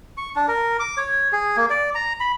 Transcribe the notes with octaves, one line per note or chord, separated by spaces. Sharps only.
C#6
D4
A#4
D6
C#5
G#4
A#3
D5
A#5
B5